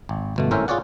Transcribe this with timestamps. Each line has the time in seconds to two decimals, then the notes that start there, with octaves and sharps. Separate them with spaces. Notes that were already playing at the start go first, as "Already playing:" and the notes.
0.09 G#1
0.36 G1 B2 A3
0.51 G#1 A2 C#4 A#4 C5 E5
0.68 F4 G#4 C#5 D5 F#5